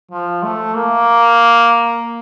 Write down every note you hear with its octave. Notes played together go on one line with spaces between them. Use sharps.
F3
A3
A#3